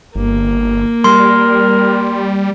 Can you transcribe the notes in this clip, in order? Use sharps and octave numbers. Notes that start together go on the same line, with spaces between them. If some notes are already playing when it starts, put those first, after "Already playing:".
G1 A#3
G3 A#4 C6